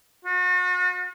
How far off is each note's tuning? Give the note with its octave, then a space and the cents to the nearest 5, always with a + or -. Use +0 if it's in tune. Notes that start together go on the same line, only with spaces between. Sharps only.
F#4 -40